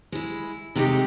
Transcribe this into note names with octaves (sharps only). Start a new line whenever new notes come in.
G#3 E4
C3 G#3 A3 D#4 G4